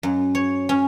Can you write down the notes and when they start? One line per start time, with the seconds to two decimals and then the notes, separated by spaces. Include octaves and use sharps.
0.03 F#2
0.35 C#5
0.69 C#4